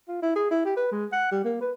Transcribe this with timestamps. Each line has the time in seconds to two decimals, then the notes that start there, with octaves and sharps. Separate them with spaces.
0.08 F4
0.22 E4
0.36 G#4
0.51 E4
0.65 G4
0.77 B4
0.91 G#3
1.12 F#5
1.31 G3
1.44 A#3
1.61 B4